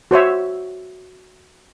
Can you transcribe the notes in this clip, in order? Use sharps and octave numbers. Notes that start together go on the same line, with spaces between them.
F#4 C5 C#5 E5